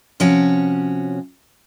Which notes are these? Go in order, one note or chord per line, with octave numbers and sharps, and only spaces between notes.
C3 F3 C#4 F#4 C#5